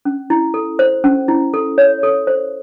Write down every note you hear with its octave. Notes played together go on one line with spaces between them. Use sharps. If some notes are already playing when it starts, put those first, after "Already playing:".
C#4
E4
A4
C5
C#4
E4
A4
C#5
A4
C5